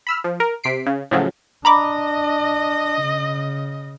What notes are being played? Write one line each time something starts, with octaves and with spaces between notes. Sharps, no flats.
B5 E6 F6
F3
A#4
C3 B6 C7 D7
C#3
A2 C#3 F3 F#3
D4 D#5 A#5 B5 D6
C#3